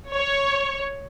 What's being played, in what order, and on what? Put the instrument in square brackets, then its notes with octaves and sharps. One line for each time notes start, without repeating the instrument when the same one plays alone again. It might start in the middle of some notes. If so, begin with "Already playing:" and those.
[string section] C#5